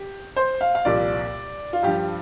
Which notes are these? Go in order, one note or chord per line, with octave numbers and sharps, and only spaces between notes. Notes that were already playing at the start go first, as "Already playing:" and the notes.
Already playing: G4
C5
F5
F5
C2 A#2 F3 D5
F4
G2 F3 G4